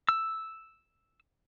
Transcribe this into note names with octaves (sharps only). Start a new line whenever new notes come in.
E6